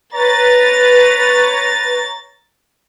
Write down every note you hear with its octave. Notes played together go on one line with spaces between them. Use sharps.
B4 C#5 A#5 A6